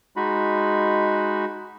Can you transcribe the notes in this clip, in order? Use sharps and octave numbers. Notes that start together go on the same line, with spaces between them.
G#3 D#4 F#4 B5